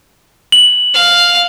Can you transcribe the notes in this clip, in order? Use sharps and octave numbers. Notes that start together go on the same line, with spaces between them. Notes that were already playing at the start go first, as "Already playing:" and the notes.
F#7
F5